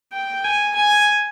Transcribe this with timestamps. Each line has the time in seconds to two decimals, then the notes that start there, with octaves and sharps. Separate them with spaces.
0.13 G5
0.44 G#5
0.75 G#5